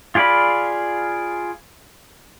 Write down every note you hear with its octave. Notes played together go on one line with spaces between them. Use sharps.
F4 G#4 D5 F5 B5